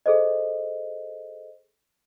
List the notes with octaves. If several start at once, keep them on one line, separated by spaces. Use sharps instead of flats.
G#4 A4 C5 D#5